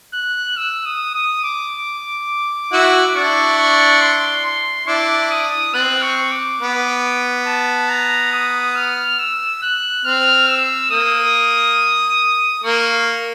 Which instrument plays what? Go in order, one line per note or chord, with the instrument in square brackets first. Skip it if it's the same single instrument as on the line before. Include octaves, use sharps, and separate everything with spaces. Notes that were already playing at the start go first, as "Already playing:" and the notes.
[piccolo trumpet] F#6
E6
D#6
D#6
D6
[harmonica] E4 F#4
[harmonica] D4 E4 [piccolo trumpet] C#6
[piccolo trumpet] C#6
C6
C6
[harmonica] D4 E4 [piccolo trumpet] D6
[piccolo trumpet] D#6
[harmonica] C4 [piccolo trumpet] F#6
[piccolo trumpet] C#6
D6
[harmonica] B3
[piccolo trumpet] A5
A#5
D#6
F6
E6
F#6
[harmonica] C4 [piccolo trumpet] F6
[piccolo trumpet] E6
[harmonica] A#3 [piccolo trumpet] D#6
[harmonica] A#3 [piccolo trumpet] C#6